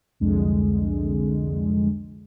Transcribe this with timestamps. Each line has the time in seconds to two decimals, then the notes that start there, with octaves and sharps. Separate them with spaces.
0.20 C2 F2 D3 G#3